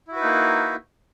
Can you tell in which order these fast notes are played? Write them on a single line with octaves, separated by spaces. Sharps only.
E4 F#4 B4 D#4 A#3